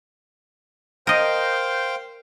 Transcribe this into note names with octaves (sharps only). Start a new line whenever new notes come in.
A#4 C5 D#5 F5 G5